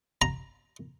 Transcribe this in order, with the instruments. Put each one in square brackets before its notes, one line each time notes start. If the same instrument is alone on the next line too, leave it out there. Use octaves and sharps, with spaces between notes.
[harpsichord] A#5